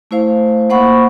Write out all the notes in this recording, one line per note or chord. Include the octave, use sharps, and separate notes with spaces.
A3 E4 C5 F5
A#3 C5 F#5 B5 C#6